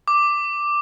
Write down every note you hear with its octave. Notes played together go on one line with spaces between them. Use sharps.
D6